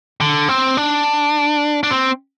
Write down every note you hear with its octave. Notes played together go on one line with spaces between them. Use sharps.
D3
C4
D4
D4
C4